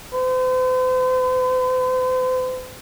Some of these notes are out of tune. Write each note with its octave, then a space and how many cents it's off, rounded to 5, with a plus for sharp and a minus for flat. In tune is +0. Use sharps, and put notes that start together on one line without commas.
C5 -45